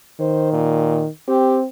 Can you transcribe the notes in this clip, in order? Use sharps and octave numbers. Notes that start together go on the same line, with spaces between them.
D#3 C5
A#2
C4 G4